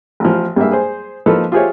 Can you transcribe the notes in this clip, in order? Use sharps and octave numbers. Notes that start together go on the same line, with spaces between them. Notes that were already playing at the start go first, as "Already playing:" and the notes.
A1 F3
G2 A#3 G#4 E5
G#4 C5
F3 A#3 D#4 A4 B4
F4 G4 G#4 C5 C#5 E5